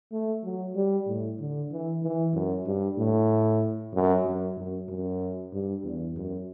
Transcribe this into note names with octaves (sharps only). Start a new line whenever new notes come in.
A3
F#3
G3
A2
D3
E3
E3
F#2
G2
A2
F#2
F#2
F#2
F#2
G2
E2
F#2